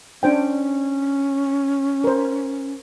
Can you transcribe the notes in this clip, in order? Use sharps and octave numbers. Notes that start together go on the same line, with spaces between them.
C#4 D4 C5 G5
A#4 C5